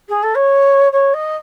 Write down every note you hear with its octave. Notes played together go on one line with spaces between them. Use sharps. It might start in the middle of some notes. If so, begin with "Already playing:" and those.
G#4
A4
C#5
C#5
D#5